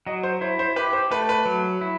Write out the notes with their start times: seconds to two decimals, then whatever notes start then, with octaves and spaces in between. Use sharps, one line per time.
0.07 F#3 D#5
0.23 C5
0.41 E4 C5
0.59 C5
0.76 G4 B4
0.93 C5
1.11 A3 B4
1.29 B4
1.46 F#3
1.81 E4